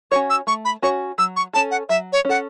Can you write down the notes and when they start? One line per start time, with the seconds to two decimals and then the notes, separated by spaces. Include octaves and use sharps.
0.11 C#4 F#4 C#5 C#6
0.30 E6
0.47 A3 C#6
0.65 B5
0.82 C#4 F#4 C#5 C#6
1.18 F#3 E6
1.36 C#6
1.53 C#4 A4 A5
1.71 F#5
1.89 F#3 E5
2.12 C#5
2.25 C#4 A4 F#5